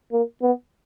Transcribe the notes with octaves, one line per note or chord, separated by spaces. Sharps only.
A#3
B3